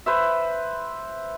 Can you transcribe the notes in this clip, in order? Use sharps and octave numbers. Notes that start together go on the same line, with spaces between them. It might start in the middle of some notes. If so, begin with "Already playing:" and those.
B4 C5 E5